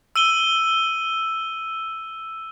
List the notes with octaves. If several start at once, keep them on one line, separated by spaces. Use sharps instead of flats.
E6 D#7 G7